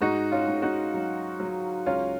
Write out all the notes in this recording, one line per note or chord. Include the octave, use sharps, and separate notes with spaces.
G#2 D#4 F#4
C#4 F4
G#2
D#4 F#4
F#3
F#3
C#2 C#4 F4